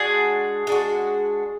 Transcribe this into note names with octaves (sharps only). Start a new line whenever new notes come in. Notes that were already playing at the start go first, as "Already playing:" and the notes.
Already playing: G#3 D4 F#4 G#4
G#3 D4 F#4